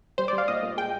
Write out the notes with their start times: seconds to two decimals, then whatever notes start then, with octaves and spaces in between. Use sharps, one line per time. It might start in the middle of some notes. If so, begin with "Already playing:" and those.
0.18 G3 C5
0.28 D5
0.33 G3
0.38 F5
0.48 A#2 D#5
0.63 A#2
0.78 G#3 G5